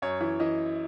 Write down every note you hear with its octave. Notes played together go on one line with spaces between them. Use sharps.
F#2 C#5
E3
E3 D#5